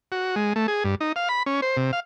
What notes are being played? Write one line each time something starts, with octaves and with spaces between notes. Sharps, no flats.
F#4
G#3
A3
G#4
G2
D#4
F5
B5
C#4
C5
C3
F5